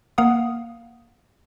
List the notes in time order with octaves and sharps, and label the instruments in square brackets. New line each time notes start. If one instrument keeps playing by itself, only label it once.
[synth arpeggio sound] A#3 F5 F#5 D#6